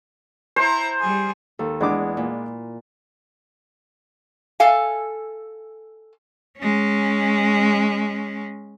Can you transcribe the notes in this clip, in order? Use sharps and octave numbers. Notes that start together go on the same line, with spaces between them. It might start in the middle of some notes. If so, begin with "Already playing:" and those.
E4 C5 A#5
G3 G#4
D#2 A4
E2 G#3 D4 D6
A#2
A4 F5 G#5
G#3 C#4